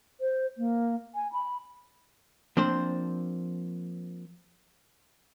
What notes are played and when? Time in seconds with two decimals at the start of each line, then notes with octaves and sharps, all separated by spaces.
0.21 C5
0.58 A#3
1.15 G#5
1.33 B5
2.57 F3 A#3 C4 D4 C5